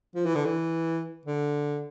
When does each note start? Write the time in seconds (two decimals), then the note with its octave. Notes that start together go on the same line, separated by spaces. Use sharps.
0.15 F3
0.25 E3
0.35 D3
0.45 E3
1.26 D3